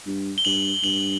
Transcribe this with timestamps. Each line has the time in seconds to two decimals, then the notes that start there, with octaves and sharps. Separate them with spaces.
0.06 G2
0.38 G7
0.45 G2 F#7
0.84 G2 F#7